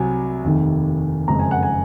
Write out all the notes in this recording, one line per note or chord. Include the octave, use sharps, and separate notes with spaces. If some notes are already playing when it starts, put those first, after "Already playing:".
Already playing: C2 C3 F#3 G#5
F1 D#2 D#3
F#1 F2 C#3 G#3 A#5
G#5
F#5
G#5